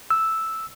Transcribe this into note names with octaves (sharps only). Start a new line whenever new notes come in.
E6